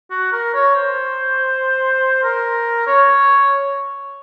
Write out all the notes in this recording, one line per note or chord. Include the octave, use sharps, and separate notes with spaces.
F#4
A#4
C#5
C5
A#4
C#5